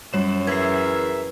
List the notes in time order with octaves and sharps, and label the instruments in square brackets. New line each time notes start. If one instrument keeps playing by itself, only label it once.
[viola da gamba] F#2 [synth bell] G3 C#5 E7
[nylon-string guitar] E3 [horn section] G#4 A#4 E5 [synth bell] G#6 C7